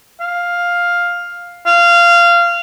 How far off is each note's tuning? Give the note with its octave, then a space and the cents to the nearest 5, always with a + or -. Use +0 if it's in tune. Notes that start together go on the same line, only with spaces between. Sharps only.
F5 +5
F5 -20